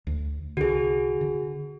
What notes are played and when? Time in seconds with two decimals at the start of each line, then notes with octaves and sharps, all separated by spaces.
0.07 D2
0.57 C2 D3 F#4 G#4
1.21 D3